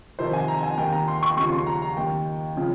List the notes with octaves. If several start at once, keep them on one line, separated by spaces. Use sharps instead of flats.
F2 C3 D#3 C5
G#5
A#5
G#5
D#2 D#3 G5
A#5
C6
C#6
D#2 C#3 F3 C#6
C6
A#5
A#5
D#2 D#3 G5
C#3 F3